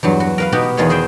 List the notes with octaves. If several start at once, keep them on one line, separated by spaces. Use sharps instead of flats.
E2 G2 F#3
F#4
A#4 B4 F5
B2 B3 D#4 F#4 G4
E2 D#3 F4 G#4 B4 C#5
F#4 G#4 C5 E5 G5